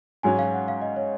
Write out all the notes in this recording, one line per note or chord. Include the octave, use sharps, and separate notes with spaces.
G#2 F#3 C#4 G#5
F5
F#5
F5
D#5
C#5